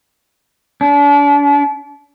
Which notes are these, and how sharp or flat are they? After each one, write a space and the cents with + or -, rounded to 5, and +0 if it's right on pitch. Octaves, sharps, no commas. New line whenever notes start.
D4 -40